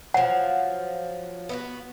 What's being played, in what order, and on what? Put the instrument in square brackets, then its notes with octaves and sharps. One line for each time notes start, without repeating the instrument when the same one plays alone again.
[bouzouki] F3 F#3 [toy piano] F#5
[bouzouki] B3 E4 F#4